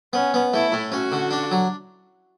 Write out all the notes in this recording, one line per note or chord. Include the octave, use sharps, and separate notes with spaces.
B3 C#4
B3
A3 E4
A2
C#4 F#4
D3
D4
F#3